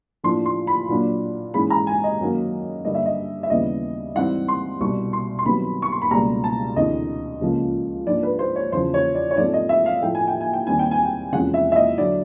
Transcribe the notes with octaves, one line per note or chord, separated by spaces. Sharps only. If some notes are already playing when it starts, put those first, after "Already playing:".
A2 F3 A#3 D4 C6
C6
B5
A#2 F#3 A#3 D4
G#2 E3 G#3 C#4 B5
A#5
G#5
D#5
F#2 D#3 F#3 A#3
G2 D3 G3 A#3 D#5
E5
D#5
E5
D#2 C#3 E3 G3 B3 D#5
G#2 E3 G3 C4 F#5
C6
C2 B2 G3 C#6
C6
C6
C2 C3 D#3 F#3 B3 B5
C#6
C6
B5
C#2 B2 G3 A#3 A#5
A5
D2 C3 E3 D#5
C#2 C#3 F3 A#3
G#2 F3 A#3 D4 D5
B4
C5
C#5
E2 C#3 F3 C5
C#5
D5
C#5
G#2 F3 A3 C4 D5
D#5
E5
F5
A2 F3 A3 G5
G#5
G5
G#5
G5
D#2 D#3 G3 C4 G#5
G5
G#5
G5
E2 C3 F3 G#3 C#4 F#5
E5
E5
D#5
D3 F#3 D5